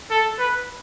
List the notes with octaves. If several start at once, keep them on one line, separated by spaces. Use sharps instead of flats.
A4
B4